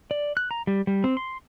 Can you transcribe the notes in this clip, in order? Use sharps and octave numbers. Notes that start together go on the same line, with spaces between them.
D5
F#6
A#5
G3
G3
C4
C6